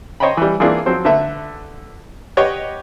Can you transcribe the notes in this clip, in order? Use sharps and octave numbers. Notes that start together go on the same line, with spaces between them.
C5 C#5 D#5 G5 A#5 B5
E3 G3
E3 A#3 C4 D4 F4 G#4
F3 F#3 C4 C5
D3 A3 B4 E5
G4 B4 C#5 D#5 F#5 G5